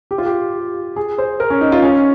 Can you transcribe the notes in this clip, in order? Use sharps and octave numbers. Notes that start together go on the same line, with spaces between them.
G4
F4
G4
G#4
C5
A#4
C#4
D#4
F4
C#4